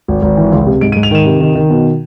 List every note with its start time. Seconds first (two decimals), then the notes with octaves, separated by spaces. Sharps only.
0.08 G#1
0.22 G#1
0.37 E3
0.52 C#2
0.66 C3
0.81 G#2 D7
0.92 G#2 D#7
1.03 F7
1.11 D#3 E7
1.25 C3
1.41 D#3
1.55 D#3
1.70 B2